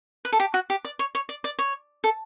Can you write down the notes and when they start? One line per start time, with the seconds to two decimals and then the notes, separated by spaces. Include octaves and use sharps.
0.25 B4
0.32 A4
0.40 G4
0.54 F#4
0.70 G4
0.85 D5
0.99 C#5
1.15 C#5
1.29 D5
1.44 D5
1.59 C#5
2.04 A4